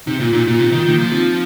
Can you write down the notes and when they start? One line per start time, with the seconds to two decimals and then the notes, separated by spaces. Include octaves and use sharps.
0.07 C3 D#4
0.20 A#2 F4
0.33 A#2 D#4
0.47 A#2 F4
0.59 C3 D#4
0.72 D#3 F4
0.86 D#3 A#3 D#4
0.99 F3
1.12 C4 F4